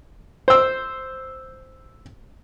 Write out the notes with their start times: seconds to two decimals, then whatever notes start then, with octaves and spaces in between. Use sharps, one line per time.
0.48 C5 E6